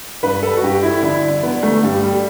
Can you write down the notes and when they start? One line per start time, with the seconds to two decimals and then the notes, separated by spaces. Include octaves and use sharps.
0.23 G2 B4
0.43 A4
0.57 F#4
0.63 G2 G4
0.83 E4
1.03 D3 E4
1.23 D4
1.43 D3 B3
1.63 A3
1.83 G2 G3
2.03 G3